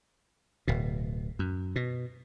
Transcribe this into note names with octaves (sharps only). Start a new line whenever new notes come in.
D1 B2
F#2
B2